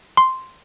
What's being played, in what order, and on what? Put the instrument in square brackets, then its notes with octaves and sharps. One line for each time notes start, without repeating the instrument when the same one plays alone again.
[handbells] C6